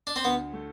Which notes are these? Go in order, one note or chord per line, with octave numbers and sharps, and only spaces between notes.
D4
C4
D2 B3
A3